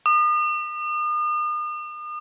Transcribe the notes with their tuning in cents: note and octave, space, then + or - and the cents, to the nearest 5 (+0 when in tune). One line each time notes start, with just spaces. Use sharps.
D#6 -40